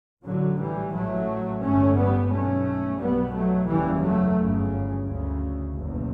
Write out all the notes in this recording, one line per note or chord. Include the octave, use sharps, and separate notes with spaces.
A1 A2 D3 F#3
E3 G3
A1 A2 F#3 A3
G1 G2 A3 C#4
G3 B3
B1 B2 A3 C#4
B1 B2 G3 B3
F#3 A3
F#1 E2 C#3 E3 G3
F#3 A3
G1 F#2 C#3
D2 C#3
F#1 E2 B2